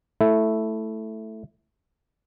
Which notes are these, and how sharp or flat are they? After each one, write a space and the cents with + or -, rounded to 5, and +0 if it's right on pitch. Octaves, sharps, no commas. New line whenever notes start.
A3 +0 E4 +0